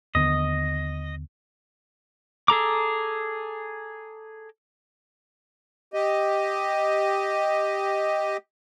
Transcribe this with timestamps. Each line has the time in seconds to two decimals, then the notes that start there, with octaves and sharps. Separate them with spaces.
0.15 D#2 D3 B3 D#5
2.48 G#4 A4 A#5 D6
5.93 G4 D#5